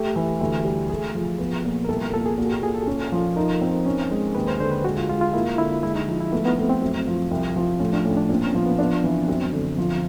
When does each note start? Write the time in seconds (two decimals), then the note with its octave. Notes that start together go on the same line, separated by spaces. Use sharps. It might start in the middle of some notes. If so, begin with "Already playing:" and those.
Already playing: A3 G4
0.16 E3
0.41 D2
0.65 G3
0.90 A3 G#4
1.15 F3
1.39 B3
1.65 A#2
1.85 A#4
1.88 C2 A4
2.01 A#4
2.14 A#2 A4
2.26 G#4
2.38 A#2 F#4
2.50 G4
2.62 A#2 G#4
2.75 A4
2.87 C#4
3.12 F3
3.36 D#4 A#4
3.61 C4
3.86 C#4
4.11 G#3
4.35 D#2 B4
4.48 C5
4.60 D3 C5
4.72 B4
4.85 G#3 F#4
4.97 F4
5.09 G#3 F4
5.21 F4
5.33 A#3 E4
5.58 D3 E4
5.83 G#3 E4
5.96 D#4
6.08 F3
6.20 E4
6.32 A3 B3
6.45 B3
6.57 A3 C4
6.70 C4
6.82 F#2
7.07 F3
7.31 C2
7.56 F3
7.80 A2 C#4
7.93 D4
8.05 A2 C#4
8.17 D4
8.29 A#2 C4
8.42 C#4
8.54 F3 B3
8.66 B3
8.79 B3 D4
9.04 E3 C4
9.28 F#2 C4
9.53 D3
9.78 F3